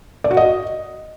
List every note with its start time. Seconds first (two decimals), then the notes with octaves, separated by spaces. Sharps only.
0.24 D5
0.31 F#4
0.37 D#5